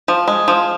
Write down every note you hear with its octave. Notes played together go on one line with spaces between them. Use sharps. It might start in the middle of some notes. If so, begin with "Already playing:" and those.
F3
G#3
F3